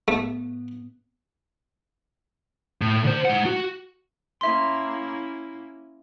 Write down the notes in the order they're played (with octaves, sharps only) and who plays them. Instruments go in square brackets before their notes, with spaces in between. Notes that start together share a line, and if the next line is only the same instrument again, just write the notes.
[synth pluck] A2 B3 [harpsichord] A3
[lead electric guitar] A2
D3 C5
G#3 F#5
F#4
[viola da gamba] A#3 C#4 E4 [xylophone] E5 C6